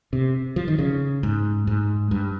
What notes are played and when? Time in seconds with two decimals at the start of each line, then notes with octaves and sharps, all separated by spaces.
0.13 C3
0.56 F3
0.68 D#3
0.79 C#3
1.23 G#2
1.67 G#2
2.11 G2